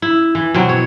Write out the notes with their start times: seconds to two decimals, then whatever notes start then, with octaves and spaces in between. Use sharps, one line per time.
0.02 E4
0.35 E3
0.54 B2 F#3 C4
0.69 C#5